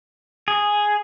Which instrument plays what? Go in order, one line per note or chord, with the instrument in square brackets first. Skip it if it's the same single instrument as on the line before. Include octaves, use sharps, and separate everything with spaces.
[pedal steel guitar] G#4